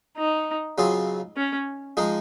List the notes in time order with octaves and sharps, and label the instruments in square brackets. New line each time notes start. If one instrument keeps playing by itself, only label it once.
[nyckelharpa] D#4
[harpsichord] C#3 F#3 C4 F4 G#4
[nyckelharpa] C#4
[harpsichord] F3 G#3 D#4 G#4